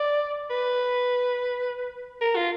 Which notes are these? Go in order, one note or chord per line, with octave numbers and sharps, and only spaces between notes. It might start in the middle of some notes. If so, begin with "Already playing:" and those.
Already playing: D5
B4
A#4
F4